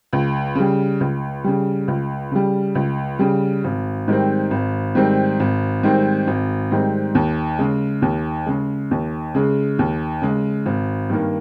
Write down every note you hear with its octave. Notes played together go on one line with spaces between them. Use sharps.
C#2
C#3 G3
C#2
C#3 G3
C#2
C#3 G3
C#2
C#3 G3
G#1
G#2 D#3 G3 C4
G#1
G#2 D#3 G3 C4
G#1
G#2 D#3 G3 C4
G#1
G#2 D#3 G3 C4
D#2
C#3 G#3
D#2
C#3 G#3
D#2
C#3 G#3
D#2
C#3 G#3
G#1
G2 D#3 A#3